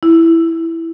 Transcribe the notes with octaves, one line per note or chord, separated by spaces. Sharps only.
E4